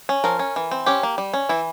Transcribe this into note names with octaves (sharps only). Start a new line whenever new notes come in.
C#4
F3 A#4
C#4
E3
C4
C#4 G4
A#3
G3
C#4
E3 E4